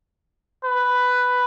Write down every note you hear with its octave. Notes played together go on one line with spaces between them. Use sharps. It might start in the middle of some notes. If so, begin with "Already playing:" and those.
B4